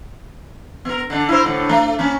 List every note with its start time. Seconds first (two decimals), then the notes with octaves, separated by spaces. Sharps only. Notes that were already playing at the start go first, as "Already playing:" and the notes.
0.85 B3 A#4
1.10 D3 D4
1.29 E4 A#4 C5
1.44 A2 D3
1.69 A3
1.98 A#3 C#4 D4